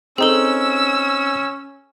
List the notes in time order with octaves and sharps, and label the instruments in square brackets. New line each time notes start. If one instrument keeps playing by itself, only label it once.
[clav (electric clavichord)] C4 D#4 [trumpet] C#4 [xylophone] G#4 A4 [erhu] E6